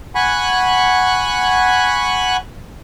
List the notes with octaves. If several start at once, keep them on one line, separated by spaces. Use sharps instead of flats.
F#5 G#5 B5 C#6 F#6